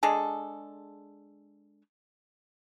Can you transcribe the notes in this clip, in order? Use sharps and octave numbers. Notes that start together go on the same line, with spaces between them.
G#3 D4 G#4 A4